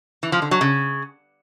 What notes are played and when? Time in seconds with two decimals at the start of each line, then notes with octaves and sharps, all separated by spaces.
0.23 E3
0.32 F3
0.42 D3
0.51 F#3
0.61 C#3